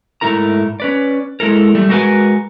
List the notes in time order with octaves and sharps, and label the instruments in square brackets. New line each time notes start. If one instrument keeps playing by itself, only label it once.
[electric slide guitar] G#2 F3 A3 E4 A#4 A#5
C#4 B4 D5
G#3 E4 A4 A#4
G3 A3
G#3 F#4 A#4 B4 F#5 G#5